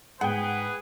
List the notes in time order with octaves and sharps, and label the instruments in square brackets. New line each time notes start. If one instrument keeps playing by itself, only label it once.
[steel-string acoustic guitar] G#2 [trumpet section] G#4 B4 [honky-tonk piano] F#5 G5